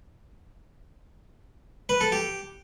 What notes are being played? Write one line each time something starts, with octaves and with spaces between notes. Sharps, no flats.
B4
A4
G4